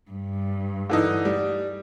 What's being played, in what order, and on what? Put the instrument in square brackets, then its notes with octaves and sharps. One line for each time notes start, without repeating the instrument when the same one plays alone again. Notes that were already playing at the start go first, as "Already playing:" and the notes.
[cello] G2
[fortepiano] D3 E3 D#4
G3